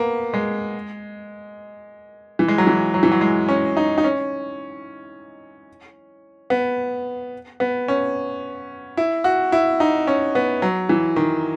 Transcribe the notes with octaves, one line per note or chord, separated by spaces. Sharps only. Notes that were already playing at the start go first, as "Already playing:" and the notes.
Already playing: A#3 B3
G#3
E3
G#3
F#3
E3
F#3
E3
F#3
G#3
C#4
D#4
D#4
C#4
B3
B3
C#4
E4
F#4
E4
D#4
C#4
B3
F#3
E3
D#3